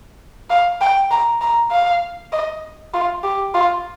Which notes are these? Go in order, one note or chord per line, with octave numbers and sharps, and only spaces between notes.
F5
G5
A#5
A#5
F5
D#5
F4
G4
F4